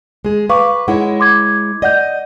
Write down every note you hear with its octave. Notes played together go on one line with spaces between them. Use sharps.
G#3 G#4
B4 F5 C#6 D6
G#3 E4 C#5 F#5
C6 D6 G#6
D5 D#5 F#5 G6